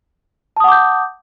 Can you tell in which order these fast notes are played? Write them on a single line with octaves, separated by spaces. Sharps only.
A5 D#6 F#5 D6 G6